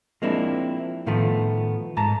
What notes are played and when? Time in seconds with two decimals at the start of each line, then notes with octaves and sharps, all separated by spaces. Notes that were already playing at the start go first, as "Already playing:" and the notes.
0.22 F3 G#3 A#3 C4 D4 E4
1.06 A2 D#3 F3 A3 B3
1.97 G#2 A5 A#5